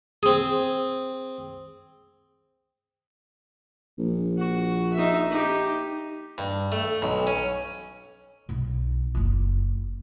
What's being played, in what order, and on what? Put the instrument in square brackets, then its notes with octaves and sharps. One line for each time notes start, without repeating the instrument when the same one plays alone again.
[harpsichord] C4 G#4
[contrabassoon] A#1
[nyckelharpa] F#4
D#4 E5
D#4 G4
[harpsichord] G2
A3
B1
C#4
[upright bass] B1
F#1 F4